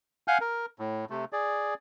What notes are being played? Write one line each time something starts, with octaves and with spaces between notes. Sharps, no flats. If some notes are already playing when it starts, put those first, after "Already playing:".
F5 F#5 G#5 F6 G6
A#4
A2
C3 A3
G#4 D5